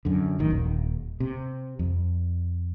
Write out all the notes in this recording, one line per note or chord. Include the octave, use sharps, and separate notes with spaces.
F#2 D3
A1 D#3
D#1
C3
F2